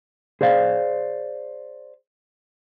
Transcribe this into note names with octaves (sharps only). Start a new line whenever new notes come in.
G#4 C5 D5 F5